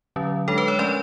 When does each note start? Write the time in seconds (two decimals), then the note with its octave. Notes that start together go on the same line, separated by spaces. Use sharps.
0.16 D3 F#3 C#4
0.48 G#3 D4 A4
0.58 B4
0.68 C#5
0.79 F3 A3 C#4 D5